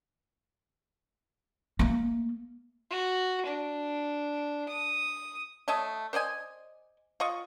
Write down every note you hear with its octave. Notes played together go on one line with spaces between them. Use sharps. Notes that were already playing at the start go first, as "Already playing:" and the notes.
A3 A#3
F#4
D4
D#6
A3 C#5 D#5 A5
C5 D5 D#5 G#5
F4 D#5 C#6